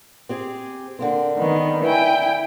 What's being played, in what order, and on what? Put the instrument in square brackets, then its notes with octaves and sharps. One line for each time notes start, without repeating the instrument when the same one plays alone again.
[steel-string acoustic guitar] C4 G4 G#4
D3 A#3 C4
[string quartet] D#3 B3
E4 G5 G#5